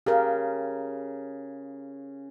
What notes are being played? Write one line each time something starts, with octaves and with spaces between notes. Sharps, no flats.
C#3 G4 G#4 A#4